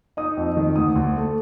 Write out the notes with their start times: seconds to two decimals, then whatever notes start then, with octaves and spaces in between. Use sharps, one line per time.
0.17 D#4 D#6
0.37 F2
0.57 D#3
0.76 D2 D#6
0.96 D2
1.16 A3